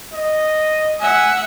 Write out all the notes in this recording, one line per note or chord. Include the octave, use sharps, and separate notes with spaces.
D#5
E5 F#5 G#5